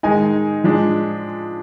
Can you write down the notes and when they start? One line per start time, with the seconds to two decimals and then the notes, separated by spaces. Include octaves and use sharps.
0.03 D#3 G#3 D#4 G#5
0.64 F3 G#3 D4